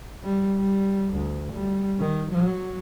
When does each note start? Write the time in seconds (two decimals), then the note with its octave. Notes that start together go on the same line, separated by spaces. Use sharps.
0.24 G3
0.58 G3
1.14 D2
1.53 G3
2.00 D#3
2.32 F#3